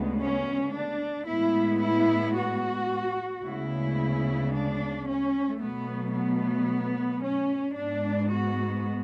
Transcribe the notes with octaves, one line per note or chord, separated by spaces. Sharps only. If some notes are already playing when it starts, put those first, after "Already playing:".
Already playing: D2 C#3 G#3 B3
C#4
D4
A2 G#3 B3 E4
E4
F#4
D2 C#3 G#3 B3 E4
D4
C#4
B2 F#3 A3 B3
B3
C#4
G#2 G#3 B3 D4
F#4